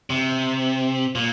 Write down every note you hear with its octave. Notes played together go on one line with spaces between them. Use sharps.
C3
A#2